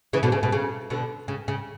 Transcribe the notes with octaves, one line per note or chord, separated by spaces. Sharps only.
C#3 E3
B2 D3
C#3
B2
C#3
B2 D3
C#3
C#3